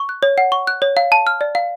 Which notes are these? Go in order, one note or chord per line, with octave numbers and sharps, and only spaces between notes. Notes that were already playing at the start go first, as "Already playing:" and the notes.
Already playing: C#6
F#6
C#5
F#5
C#6
F#6
C#5
F5
A5
F6
D5
F5